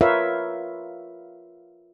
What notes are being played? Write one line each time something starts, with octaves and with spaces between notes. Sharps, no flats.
F4 A#4 B4 C#5 E5 F5